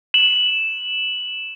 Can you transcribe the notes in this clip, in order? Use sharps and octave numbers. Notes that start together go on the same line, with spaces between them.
E7 F#7